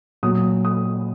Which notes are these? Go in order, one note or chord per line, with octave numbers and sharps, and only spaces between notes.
A#2 F#3 D#6
D#6